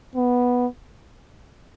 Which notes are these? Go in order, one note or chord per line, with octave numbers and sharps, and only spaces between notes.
B3